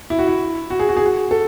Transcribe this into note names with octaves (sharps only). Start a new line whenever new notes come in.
E4
F#4
E4
F#4
G#4
F#4
G#4
F#4
A4